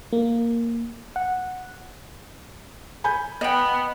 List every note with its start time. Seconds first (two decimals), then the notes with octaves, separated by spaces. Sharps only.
0.13 A#3
1.16 F#5
3.04 G#5 B5 G6
3.41 B3 D#5 G5